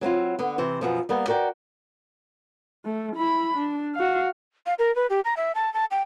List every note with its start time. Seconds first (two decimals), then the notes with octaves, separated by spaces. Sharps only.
0.01 F#3 C4 E4 F4
0.39 D3 B3
0.58 C3 E3 C5
0.81 F#2 B2 F3
1.09 G3 A#3 B3
1.28 F#4 A#4 D5 G5
2.85 A3
3.16 E4 B5
3.57 D4
3.95 F#4 F5
4.66 F5
4.79 A#4
4.96 B4
5.10 G4
5.25 A#5
5.37 E5
5.55 A5
5.74 A5
5.91 G5